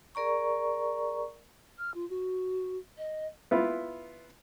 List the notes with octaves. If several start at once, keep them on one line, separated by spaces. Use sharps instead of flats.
G#4 A#4 D5 A#5 C#6
F6
F4
F#4
D#5
B3 E4 F4